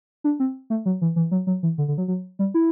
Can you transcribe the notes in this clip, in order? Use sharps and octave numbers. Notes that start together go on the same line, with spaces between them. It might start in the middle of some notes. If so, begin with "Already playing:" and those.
D4
C4
A3
F#3
E3
E3
F#3
F#3
E3
D3
D3
F#3
F#3
G3
E4